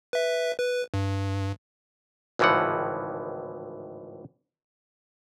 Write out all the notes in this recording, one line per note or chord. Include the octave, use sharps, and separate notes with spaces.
B4 E5
B4
G2
G#1 C#2 A2 E3 F3 F#5